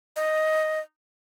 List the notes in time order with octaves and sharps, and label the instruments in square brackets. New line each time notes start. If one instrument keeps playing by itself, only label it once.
[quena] D#5